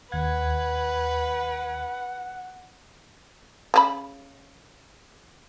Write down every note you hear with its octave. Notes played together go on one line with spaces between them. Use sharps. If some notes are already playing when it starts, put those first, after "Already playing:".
D#2 B4 F#5 G#6
C#3 C4 B5